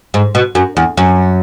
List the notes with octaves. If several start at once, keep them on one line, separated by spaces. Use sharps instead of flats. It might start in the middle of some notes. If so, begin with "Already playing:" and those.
G#2
B2
F#2
E2
F#2